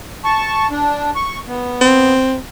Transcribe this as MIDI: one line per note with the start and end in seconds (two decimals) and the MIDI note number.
0.24 0.67 81
0.24 0.67 85
0.71 1.11 62
1.15 1.39 85
1.48 2.14 59
1.81 2.37 60